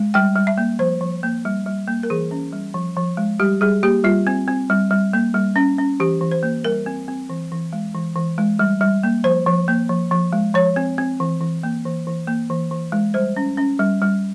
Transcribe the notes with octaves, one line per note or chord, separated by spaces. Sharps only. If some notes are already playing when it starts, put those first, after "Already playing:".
Already playing: G#3
G3 G5
G3
E5
A#3
F3 C5
F3
A#3
G3
G3
A#3
A#4
E3 G#4
C#4
G3
F3
F3
G#3
G3 G4
G3 G#4
A#3 G4
G3 F4
C4
C4
G3
G3
A#3
G3
C#4
C#4
E3 G4
E3
C5
A#3
G3 A#4
C4
C4
E3
E3
G#3
E3
E3
G#3
G3
G3
A#3
F3 C5
F3
A#3
F3
F3
G#3
F3 C#5
C4
C4
E3
E3
A#3
E3
E3
A#3
E3
E3
G#3
G3 C5
C#4
C#4
G3
G3